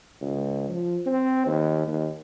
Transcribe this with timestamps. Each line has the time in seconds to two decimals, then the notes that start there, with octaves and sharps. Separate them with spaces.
0.21 C#2
0.69 F3
1.06 C4
1.46 D#2
1.88 D#2